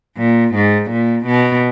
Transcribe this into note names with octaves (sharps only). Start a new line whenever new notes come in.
A#2
G#2
A#2
B2